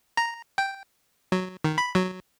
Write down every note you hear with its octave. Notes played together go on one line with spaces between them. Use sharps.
A#5
G5
F#3
D#3
B5
F#3